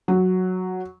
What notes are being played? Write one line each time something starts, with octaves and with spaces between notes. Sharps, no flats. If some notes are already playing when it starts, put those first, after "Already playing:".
F#3